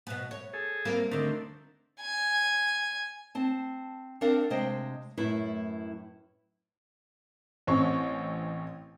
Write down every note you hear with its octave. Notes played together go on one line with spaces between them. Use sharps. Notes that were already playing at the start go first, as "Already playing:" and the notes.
B2 B3
C#5
G#4 A4
G3 A#3 C4
D2 D3 D#3 A3 C4
G#5
C4 A5
C4 D4 A#4 F5 F#5
C3 G#3 C5 D#5 F5 G5
F#2 A2 E4 B4
A1 C4 C#4 C#6